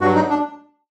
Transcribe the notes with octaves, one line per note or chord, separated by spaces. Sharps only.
G2 F#3 F#4
D#4
D4